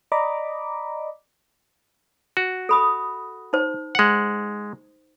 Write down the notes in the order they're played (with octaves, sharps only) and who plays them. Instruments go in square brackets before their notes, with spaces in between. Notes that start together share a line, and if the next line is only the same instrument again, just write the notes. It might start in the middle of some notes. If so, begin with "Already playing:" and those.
[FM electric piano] D5 D#5 A#5 B5 D6
[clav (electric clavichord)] F#4
[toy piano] A4 B5 D#6
D#4 C5
[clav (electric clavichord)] G#3 F#5